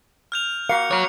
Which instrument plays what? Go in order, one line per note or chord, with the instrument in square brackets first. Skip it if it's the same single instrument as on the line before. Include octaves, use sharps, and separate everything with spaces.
[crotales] F6 G6 F7
[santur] A#3 F#4 [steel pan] F5 [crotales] C#7
[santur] A#3 [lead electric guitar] F#4 C#5